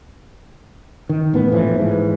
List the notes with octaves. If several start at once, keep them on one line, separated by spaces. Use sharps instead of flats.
D#3
A1 B3
A#1 A2 E3 F3
G#2 E3